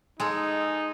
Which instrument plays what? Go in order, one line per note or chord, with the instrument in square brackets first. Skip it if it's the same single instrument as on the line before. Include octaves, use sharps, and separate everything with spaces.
[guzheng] G#3 G#4 A4 [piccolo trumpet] D#4